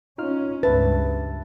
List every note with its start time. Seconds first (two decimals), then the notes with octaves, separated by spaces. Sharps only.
0.18 C#4 D#4 F4 F6
0.63 C#2 G2 B4 E5 A5 A6